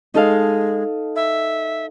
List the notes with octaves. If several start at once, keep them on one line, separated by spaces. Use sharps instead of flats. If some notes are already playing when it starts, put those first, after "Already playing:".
G#3 D#4 A4 F5
E5